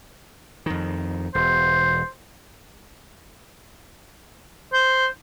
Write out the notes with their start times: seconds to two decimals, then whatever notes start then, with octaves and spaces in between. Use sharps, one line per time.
0.66 F2 D#3
1.35 E1 C5
4.73 C5